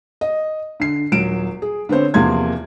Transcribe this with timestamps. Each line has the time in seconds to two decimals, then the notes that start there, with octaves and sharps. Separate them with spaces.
0.21 D#5
0.80 D3 C7
1.12 D#1 F#3 D7 E7
1.62 G#4
1.89 D3 B3 C4 C5 C#5
2.14 E2 C3 F3 A#3 C6 G#6